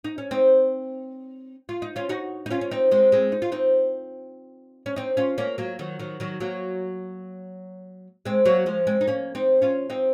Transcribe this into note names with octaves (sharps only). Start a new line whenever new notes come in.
D#4
C#4
C4 D#4
F4
D#4
C#4 F4
D#4 F#4
D#4
C#4 F4
C#4
C4 D#4
G#3 C4
G#3 C4
D#4
F4
C4 D#4
C#4
C4 D#4
C#4 F4
A#3 C#4
F#3 A#3
D#3 F#3
D#3 F#3
D#3 F#3
F#3 A#3
G#3 C4
F#3 A#3
F3 G#3
G#3 C4
D#4
A#3 C#4
C4 D#4
C#4 F4
C4 D#4